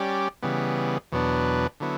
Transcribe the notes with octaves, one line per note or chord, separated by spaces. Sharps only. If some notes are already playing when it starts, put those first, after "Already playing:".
Already playing: G3 C#4 G4 D5
C#3 E3 G3 B3
E2 B2 F#3 B3 D4
D3 F#3 B3 E4